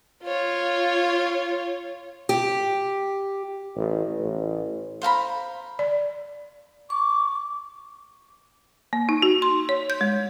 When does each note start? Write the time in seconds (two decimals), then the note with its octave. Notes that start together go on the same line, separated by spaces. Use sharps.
0.23 F4 C#5
2.29 G4
3.76 A1
4.19 A1
5.02 C5 F5 A#5 B5
5.79 D5
6.90 C#6 D6
8.93 A#3
9.09 D#4
9.22 F#4
9.42 C6
9.69 C#5
9.90 G6
10.01 G#3